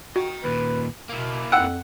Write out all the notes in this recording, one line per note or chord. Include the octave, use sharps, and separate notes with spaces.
F#4 D#5 G5
D#2 A#2 B4
B2 A#3 E4
F2 F#5 G5 E6 F#6